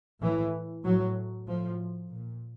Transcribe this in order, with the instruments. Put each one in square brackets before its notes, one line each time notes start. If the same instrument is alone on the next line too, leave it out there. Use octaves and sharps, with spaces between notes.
[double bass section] A2 E3
A2 F#3
A2 F3
A#2